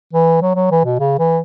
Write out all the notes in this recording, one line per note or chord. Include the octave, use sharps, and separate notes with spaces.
E3
F#3
F#3
E3
B2
C#3
E3